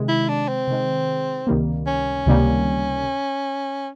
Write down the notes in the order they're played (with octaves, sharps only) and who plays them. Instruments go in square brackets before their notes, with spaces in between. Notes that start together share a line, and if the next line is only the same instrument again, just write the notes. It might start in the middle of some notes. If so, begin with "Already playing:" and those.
Already playing: [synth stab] C3 D#3 G#3
[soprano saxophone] E4
D4
C4
[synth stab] C3 D#3 G#3
C#2 C3 D#3 G3 A#3
[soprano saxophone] C#4
[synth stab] C#2 C3 D#3 G3 A#3